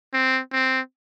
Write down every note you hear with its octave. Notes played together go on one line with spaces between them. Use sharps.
C4
C4